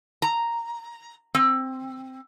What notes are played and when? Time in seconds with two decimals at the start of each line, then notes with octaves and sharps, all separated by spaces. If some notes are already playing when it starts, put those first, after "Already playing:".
0.22 A#5
1.35 C4